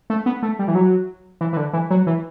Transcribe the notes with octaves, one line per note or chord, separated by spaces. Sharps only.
A3
B3
A3
G3
E3
F#3
E3
E3
D3
E3
F#3
E3